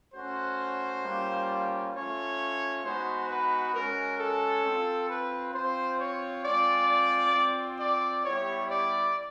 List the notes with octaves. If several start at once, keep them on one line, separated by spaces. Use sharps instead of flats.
A3 C#4 F#4 C5
G3 A#3 C#4 F4
A3 C#4 F4 C#5
G#3 B3 D#4 F#4 C5
B4
G#3 C#4 F#4 A#4
A4
C4 F4
B4
C4 F4 C5
C#5
G#3 C4 F4 D5
C4 F4
D5
G3 B3 E4 G4 C#5
D5